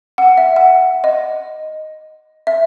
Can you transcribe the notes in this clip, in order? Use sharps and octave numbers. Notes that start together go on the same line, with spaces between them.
F#5
E5
F#5
D#5
E5